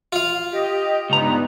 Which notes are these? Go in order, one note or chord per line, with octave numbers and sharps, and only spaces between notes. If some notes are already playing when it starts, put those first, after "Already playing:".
F4 F5
G4 D#5
C#2 G2 B3 D#4 A#5